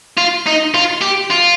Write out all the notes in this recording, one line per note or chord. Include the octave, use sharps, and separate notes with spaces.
F4
D#4
F4
G4
F4